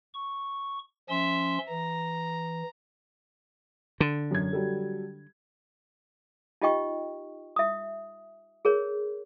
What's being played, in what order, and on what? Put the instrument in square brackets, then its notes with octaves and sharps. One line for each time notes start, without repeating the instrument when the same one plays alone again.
[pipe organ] C#6
[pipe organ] F3 C#4 C6 [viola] E5
[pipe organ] E3 [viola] A#5
[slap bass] D3
[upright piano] F#2 G#6
F#3 G3 A4
[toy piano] D#4 F4 G4 D#5 G5 C#6
E5 D#6
G#4 A#4 C#5